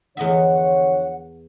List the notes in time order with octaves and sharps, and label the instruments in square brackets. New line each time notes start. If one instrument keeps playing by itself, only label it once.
[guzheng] E2 D#5 E5 [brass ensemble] D3 F3 C#5 [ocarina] F#5